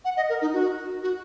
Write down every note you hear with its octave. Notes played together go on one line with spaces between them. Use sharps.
F#5
D#5
A#4
D#4
F#4
F#4